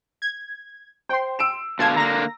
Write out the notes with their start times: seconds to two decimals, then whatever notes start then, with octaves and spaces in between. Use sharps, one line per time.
0.22 G#6
1.09 C5 G5 C6
1.39 E6 D7 E7
1.79 B2 D3 F5 A5 G#6
1.96 D3 A#3 A#5 A#6